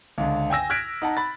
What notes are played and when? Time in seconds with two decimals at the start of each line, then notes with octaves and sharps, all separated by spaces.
0.18 C#2 D3
0.50 G5 G#5 E6 A#6
0.70 F6 F#6 G#6 B6 D7
1.02 D#4 F#5 A5 A#5
1.17 B5 A6